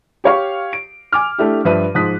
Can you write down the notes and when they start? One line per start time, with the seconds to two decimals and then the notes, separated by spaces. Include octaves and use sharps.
0.24 G4 C#5 F5 C#6
0.73 D7
1.12 G#5 D6 F6
1.38 A3 D4 E4 G4
1.65 G2 F3 B4 E5 D#7
1.95 G#2 F3 D#6 F#6 B6